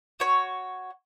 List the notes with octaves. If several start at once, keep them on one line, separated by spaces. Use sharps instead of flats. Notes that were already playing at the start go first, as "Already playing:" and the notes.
F#4 C#5